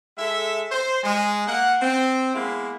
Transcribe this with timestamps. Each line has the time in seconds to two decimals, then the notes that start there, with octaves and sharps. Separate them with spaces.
0.18 G#3 A4 E5
0.71 C5
1.04 G#3
1.47 A#3 F#5
1.82 C4
2.34 G#3 A#3 B3 E4